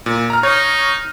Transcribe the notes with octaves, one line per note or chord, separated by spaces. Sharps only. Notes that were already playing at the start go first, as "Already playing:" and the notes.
A#2
A#5 F6
D#4 C#5